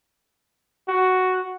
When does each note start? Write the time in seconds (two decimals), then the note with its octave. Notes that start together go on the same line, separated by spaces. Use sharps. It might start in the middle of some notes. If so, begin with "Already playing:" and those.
0.88 F#4